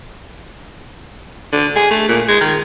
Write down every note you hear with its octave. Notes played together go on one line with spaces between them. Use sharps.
D3
G#4
A3
A#2
G#3
D#3